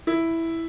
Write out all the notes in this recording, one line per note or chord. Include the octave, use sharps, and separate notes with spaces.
E4